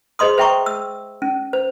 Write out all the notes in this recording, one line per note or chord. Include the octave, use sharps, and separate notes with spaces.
G#4 C5 D#5 C6 D#6
C5 E5 G5 A#5 C#6 D6
E6
C#4
C5